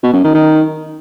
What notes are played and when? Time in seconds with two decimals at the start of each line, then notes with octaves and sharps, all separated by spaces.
0.03 B2
0.13 F#2
0.24 D#3
0.35 D#3